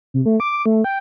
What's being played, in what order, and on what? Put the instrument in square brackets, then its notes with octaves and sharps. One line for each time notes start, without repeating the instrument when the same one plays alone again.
[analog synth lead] C3
A3
D6
A3
G5